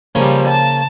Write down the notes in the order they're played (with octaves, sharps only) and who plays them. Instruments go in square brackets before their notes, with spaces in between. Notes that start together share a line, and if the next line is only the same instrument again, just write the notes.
[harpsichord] C#3 A#3 C#4 [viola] F3 G3
[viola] A5